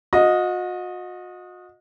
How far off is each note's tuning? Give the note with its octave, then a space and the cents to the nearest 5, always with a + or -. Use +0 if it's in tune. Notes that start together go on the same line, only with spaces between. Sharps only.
F#4 -40 D#5 +0